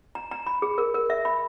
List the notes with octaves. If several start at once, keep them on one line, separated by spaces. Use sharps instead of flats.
A#5
A#5
B5
G#4
A#4
A#4
E5
B5